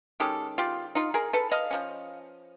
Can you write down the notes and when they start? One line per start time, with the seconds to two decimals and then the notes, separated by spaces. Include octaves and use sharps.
0.20 D#3 G#3 C#4 G4 A4
0.58 F4 G4
0.95 D#4 F4
1.14 G#4 A#4
1.33 A4 B4
1.52 D#5 F5
1.71 F3 A#3 C#4